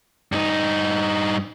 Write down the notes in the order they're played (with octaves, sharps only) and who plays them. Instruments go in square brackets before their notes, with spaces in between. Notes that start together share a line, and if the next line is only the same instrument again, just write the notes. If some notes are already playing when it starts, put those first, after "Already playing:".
[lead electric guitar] G2 D#4